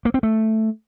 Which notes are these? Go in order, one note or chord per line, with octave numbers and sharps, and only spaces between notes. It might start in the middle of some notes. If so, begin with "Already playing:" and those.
A#3
C4
A3